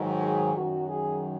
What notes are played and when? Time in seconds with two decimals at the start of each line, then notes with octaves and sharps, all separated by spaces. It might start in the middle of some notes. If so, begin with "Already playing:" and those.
Already playing: G#2 D#3 F#3
0.22 G#4
0.55 F#2 D#3 F#3 F#4
0.88 G#4